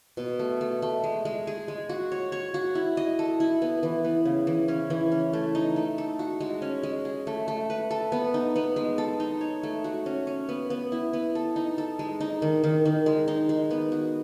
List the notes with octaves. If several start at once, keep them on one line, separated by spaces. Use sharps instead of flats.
B2
A3
A3
A3
G#3
G#3
G#4
G#3
F#4
C#5
C#5
F#4
E4
D#5
A4
E4
B3
E3
B3
C#3
E3
C#4
E3
C#4
A3
D#4
A3
A4
F#4
G#3
C#4
G#3
G#4
A3
A3
B4
A4
B3
D#4
B3
G#3
A4
D#4
C#5
A3
F#4
C#4
C#4
B3
B3
E4
B3
A4
D#4
A4
G#3
D#4
D#3
D#3
D#3
G#3
D#4
G#3
B3
F#4